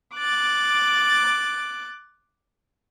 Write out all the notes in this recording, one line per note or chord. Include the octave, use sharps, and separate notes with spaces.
D6 F#6 A6